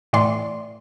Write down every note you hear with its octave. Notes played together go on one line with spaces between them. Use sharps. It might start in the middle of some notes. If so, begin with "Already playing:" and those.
A2 E3 D5 C6